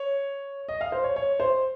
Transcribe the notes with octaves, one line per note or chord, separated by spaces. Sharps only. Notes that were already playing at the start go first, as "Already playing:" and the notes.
Already playing: C#5
D#5
F5
C5
C#5
C#5
C5